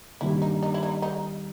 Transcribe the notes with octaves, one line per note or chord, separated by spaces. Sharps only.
G2 D#3 G3 A#3 E4
D#4
D#4
E4
D#4
D#4